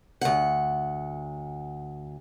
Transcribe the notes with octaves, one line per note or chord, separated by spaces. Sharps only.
D2 F#5